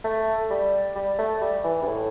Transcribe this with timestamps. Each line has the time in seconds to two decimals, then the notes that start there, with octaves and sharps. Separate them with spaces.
0.04 A3
0.50 G3
0.96 G3
1.19 A3
1.41 G3
1.64 E3
1.82 G2
1.87 A2